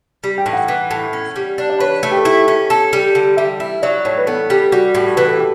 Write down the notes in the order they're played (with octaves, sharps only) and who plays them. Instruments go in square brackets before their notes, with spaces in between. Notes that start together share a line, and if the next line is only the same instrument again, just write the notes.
[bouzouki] G3
[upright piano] G5
[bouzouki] A2
[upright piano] F#5
[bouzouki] E3
A2
C#4
G3
D4
[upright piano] D5
[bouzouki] B4 [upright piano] C#5
[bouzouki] A3
[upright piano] G4
A4
[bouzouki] E4
C#4
A4
G3
D3
[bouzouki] G3 [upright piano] E5
[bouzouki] E4
[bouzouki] F#3 [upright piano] D5
[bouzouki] A2 [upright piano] C#5
[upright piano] B4
[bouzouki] B3 [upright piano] A4
[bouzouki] G3 [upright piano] G4
[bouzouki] G3 [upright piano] F#4
[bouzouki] A2 [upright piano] G4
[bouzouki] E3 [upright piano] B4
[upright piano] A4
G4